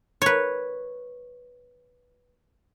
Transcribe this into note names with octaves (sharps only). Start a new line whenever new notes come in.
B4 C#5